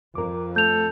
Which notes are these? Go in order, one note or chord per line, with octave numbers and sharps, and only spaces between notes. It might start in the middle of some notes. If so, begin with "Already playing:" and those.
F2 A#4 D6
A3 A4 G6 F7